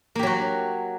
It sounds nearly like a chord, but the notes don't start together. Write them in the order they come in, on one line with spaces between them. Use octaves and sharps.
A#3 G4 F#3 F#4